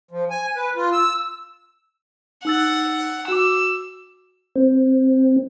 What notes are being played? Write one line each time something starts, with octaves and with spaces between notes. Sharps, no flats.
F3
G#5
B4
F4
E6
D#4 F#5 E6 A6
F#4 D6 E6
C4